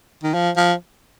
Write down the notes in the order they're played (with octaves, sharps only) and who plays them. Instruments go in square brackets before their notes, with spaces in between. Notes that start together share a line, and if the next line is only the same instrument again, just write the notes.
[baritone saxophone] D#3
F3
F3